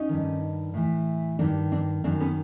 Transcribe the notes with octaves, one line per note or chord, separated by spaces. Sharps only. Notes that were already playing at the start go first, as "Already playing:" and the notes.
Already playing: C#4 D#4
G2 D#3
A2 E3
G2 D#3 C4 D4
C4 D4
F#2 D#3 C4 D4
B3 C#4